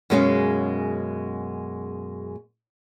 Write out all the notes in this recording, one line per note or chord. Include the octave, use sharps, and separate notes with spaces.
F#2 B2 G#3 C#4 G#4 F5